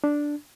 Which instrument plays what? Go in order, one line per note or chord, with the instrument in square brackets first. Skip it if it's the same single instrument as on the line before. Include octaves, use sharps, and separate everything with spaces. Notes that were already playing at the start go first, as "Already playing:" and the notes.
[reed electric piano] D4